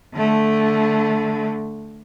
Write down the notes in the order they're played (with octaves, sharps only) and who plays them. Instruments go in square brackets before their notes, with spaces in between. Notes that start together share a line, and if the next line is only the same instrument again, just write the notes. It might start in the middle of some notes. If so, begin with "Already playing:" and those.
[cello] D3 A3